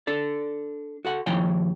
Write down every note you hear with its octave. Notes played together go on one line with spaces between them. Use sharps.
D4 A4 D5
F#4 A4 F#5
D#2 F3 E4 C#5 G5 G#5